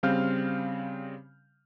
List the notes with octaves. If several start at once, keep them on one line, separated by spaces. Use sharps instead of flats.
C#3 G3 C4 F5 F6 G6